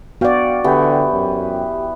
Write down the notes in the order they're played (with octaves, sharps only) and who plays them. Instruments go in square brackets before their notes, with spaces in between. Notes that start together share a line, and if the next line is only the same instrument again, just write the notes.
[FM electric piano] B3 F5 G5 [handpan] F#4 D5
[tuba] D3 [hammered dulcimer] E3 B3 E4 [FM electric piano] G4 G5
[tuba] F#2